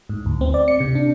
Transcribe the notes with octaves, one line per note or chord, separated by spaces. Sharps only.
G#2
D2
C4
D5
C#7
C3
D4